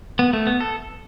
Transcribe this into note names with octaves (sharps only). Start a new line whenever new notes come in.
B3
A3
B3
A4